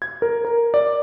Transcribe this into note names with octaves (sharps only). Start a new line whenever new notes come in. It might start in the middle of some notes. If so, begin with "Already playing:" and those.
G#6
A#4
A#4
D5